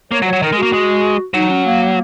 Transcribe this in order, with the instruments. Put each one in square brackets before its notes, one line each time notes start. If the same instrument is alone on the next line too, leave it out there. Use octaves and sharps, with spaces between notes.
[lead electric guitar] A#3 [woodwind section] C#5
[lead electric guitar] F#3
[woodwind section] C#5
[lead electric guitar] F#3
[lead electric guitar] D#3 [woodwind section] A#4
[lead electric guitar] G#3
[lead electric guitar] A#3 [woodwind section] F#4
[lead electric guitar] G#3
[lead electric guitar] F#3 [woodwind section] D#4
[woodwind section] C#4
A#3